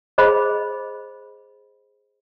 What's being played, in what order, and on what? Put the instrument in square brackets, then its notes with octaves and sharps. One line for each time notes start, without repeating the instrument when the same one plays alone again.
[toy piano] G#4 C5 D#5 B5